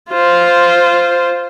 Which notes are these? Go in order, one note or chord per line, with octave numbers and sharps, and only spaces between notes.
F4 C5